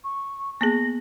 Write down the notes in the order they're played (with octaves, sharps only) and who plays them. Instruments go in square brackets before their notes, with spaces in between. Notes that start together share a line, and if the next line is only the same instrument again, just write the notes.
[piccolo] C#6
[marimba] A#3 B3 G#4 [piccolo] A#6